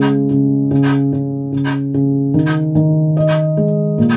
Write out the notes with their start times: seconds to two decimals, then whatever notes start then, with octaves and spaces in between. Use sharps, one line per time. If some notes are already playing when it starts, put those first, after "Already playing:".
Already playing: C#3 G#3
0.31 C#3
0.71 C#3
1.13 C#3
1.52 C#3
1.94 C#3
2.34 D#3
2.75 D#3
3.17 D#5
3.57 G#3
3.98 A#2